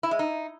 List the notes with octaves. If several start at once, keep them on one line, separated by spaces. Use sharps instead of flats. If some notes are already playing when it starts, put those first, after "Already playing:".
E4
G#3
D#4